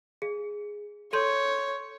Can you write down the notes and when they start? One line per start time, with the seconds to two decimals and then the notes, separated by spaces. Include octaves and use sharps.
0.22 G#4
1.13 A4 C#5 C6 G6